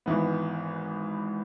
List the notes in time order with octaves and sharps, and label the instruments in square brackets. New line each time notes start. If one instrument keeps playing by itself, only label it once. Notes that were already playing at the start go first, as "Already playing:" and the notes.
[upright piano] G#1 G#2 E3 B3